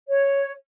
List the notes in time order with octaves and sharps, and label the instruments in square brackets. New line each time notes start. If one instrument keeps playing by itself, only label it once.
[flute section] C#5